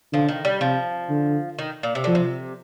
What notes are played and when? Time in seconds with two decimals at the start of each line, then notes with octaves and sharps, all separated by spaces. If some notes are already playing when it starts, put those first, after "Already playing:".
0.13 D3 F3
0.29 D#3
0.45 G3
0.61 C3 F3
1.10 D3
1.59 D#3
1.83 A#2
1.95 C3
2.04 D3 F3
2.15 C3